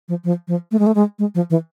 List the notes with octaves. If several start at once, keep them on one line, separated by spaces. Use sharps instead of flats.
F3
F3
F3
A3
G#3
A3
G#3
G#3
F3
E3